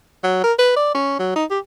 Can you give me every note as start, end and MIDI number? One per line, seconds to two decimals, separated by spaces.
0.23 0.39 54
0.44 0.53 70
0.59 0.72 71
0.76 0.93 74
0.94 1.19 61
1.19 1.31 54
1.36 1.45 63
1.50 1.59 67